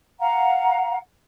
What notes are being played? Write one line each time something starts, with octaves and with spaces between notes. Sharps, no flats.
F5 F#5 A#5